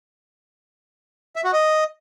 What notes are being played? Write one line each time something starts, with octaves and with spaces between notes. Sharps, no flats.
E5
F#4
D#5